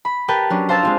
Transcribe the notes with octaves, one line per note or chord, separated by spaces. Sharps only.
B5
G4 A#4 B4 G5 A5
F#3 C#4 D4
C5 F5 A5 C6 E6 A6
G#3 C4 F4